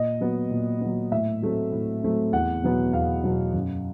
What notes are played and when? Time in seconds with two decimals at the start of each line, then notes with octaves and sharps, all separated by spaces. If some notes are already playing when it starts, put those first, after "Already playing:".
Already playing: A#2 D#5
0.21 F#3 B3
0.51 A#2
0.81 F#3 B3
1.12 A2 E5
1.42 F#3 A3 C4
1.72 A2
2.03 F#3 A3 C4
2.33 E2 F#5
2.64 B2 F#3 B3
2.93 E2 F5
3.24 B2 F#3 B3
3.54 F#2